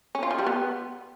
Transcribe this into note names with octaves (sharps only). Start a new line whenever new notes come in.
C#4
F4
F3
G3
B3